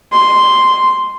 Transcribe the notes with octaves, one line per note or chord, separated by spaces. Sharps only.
C6